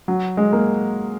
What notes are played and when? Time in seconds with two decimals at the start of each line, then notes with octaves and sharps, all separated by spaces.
0.08 F#3
0.37 G#3
0.53 A#3